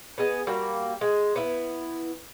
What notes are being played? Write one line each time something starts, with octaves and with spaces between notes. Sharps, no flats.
B3 G#4 D#5
G3 A#3 F#4
G#3
B3 E4